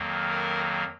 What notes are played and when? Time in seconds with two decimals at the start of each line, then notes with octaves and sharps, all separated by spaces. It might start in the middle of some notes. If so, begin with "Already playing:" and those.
Already playing: F2 D#3 F#3 A#3
0.31 A#4